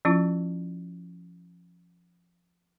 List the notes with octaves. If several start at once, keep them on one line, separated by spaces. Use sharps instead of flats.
F3 C#4 E4 F4